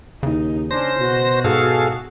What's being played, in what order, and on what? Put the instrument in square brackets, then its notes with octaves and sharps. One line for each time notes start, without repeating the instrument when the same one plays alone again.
[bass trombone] D#2 [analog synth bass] C#3 [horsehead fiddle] D#4
[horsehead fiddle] C#4 D4 [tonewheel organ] C5 A#6
[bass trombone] B2 [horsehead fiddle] F#4
[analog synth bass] G#2 [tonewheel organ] G#4 A4 F5